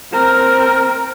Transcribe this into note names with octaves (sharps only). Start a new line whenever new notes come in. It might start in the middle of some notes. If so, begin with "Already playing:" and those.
C4 A#4